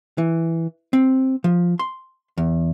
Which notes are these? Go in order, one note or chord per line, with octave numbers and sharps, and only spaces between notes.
E3
C4
F3
C6
E2